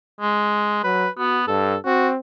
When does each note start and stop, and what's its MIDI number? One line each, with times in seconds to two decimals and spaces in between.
0.21 0.81 56
0.84 1.07 54
0.84 1.09 71
1.18 1.46 59
1.18 1.39 66
1.48 1.77 43
1.48 1.77 69
1.85 2.19 60
1.85 2.09 66